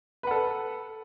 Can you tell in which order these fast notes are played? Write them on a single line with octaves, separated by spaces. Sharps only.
B4 F#5 A4